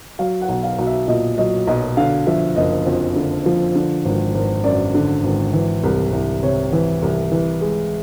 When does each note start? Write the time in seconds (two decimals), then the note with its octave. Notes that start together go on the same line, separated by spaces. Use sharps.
0.19 F#3 F5
0.41 F#5
0.49 B1
0.63 F5
0.78 B1
0.86 E5
1.08 A#2 D#5
1.38 F#3 D#5
1.67 B1 D#5
1.97 D3 F5
2.27 F3 E5
2.56 F#1 D#5
2.86 F2
3.16 D3
3.46 F3
3.75 D3
4.05 G#1
4.35 G#1
4.64 F#2 D5
4.95 D3
5.24 G#1
5.53 E3
5.83 C2
6.13 C2
6.43 C3 C#5
6.73 E3
7.02 C2
7.32 E3
7.61 G#3